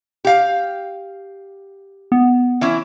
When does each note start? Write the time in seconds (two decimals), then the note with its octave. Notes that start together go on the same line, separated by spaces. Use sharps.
0.25 G4 F5
2.12 B3
2.61 E3 C#4 E4